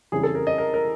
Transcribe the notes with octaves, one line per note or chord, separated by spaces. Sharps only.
F2 C#3 E3 G3 G#4
A4
A#4
D#5
A#4
A#4